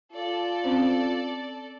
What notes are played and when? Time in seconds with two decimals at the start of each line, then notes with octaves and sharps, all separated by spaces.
0.13 F4 A4 D5
0.64 C4 C#4 C5